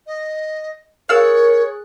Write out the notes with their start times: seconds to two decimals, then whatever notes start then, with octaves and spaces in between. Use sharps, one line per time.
0.07 D#5
1.09 G#4 A#4 C#5 F5 E6 F#6